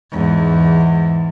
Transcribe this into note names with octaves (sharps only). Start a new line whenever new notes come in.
E2 G#2